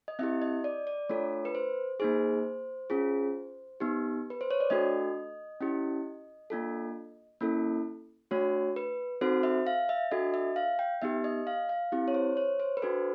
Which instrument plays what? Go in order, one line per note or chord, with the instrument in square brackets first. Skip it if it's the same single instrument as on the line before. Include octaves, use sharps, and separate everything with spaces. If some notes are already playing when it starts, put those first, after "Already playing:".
[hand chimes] D#5
C4 E4 G4 E5
D#5
D5
D5
A3 D4 F4 A4 C#5
B4
C5
A#3 D#4 G#4 C5
C#4 F4 G#4
B3 D#4 G4
B4
C5
C#5
D5
A3 D4 F#4 A4 D#5
C#4 E4 G4
A#3 D4 F4 A4
A#3 C#4 E4 A4
A3 D4 F#4 C#5
B4
C4 D#4 F#4 A4 C5
E5
F5
E5
D4 F#4 A4 D#5
E5
F5
G5
B3 D#4 G4 E5
D#5
F5
F5
C4 E4 G4
C#5
C5
C#5
C5
B4
D4 F#4 A4 C5